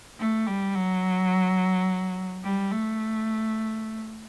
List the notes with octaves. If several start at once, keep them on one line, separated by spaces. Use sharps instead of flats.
A3
G3
F#3
G3
A3